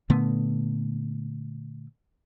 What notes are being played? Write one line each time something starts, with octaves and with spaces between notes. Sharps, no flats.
A#2 D3 A3 B3